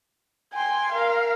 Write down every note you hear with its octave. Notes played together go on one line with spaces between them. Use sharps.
G5 G#5 C6
A#4 F5